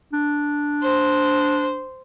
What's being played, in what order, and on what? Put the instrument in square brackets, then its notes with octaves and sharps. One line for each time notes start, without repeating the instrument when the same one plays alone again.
[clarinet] D4
[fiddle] C5